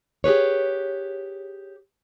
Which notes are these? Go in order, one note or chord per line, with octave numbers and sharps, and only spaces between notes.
G4 G#4 B4 C#5